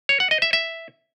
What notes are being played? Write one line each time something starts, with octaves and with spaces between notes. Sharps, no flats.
C#5
F#5
D#5
E5
E5